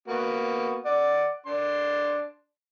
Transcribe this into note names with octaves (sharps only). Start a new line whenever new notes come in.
A#3 B3 F#4
D5 F#5
D4 C6